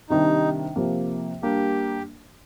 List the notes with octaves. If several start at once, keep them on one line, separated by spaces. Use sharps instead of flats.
C3 D#3 G3 D4 D#4
C3 F3 A#3
G3 A#3 D4 G4